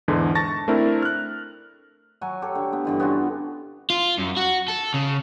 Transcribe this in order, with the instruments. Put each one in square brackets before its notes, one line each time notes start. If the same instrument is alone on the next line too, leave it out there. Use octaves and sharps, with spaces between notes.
[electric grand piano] E2 G#2 D3 E3
A5 C#6 A6 A#6
A3 C4 D4 E4 A#4
F6 F#6
[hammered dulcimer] F#3 F#4 G#5
G4 A4 C#5
D3
B3
G2 D3 E3
B3 C#4 F4 F#4
[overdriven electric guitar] F4
F#2
F#4
A4
C#3